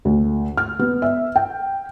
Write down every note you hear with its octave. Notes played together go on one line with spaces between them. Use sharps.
D2
F6
B3
E5
G5